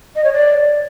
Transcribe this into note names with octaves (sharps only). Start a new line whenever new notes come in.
D#5
C#5
D5